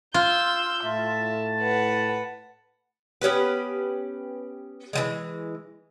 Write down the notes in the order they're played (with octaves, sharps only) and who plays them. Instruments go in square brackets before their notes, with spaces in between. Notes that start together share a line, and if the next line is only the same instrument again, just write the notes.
[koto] F4 [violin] E6 G6
[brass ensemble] A2 A5 [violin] E5
[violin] B4 F#5
[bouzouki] B3 C#4 G4 B4
E3 F3 G#3